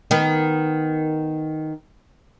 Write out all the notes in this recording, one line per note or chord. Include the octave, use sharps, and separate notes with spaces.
D#3 B3